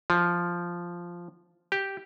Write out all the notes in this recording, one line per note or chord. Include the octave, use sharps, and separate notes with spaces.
F3
G4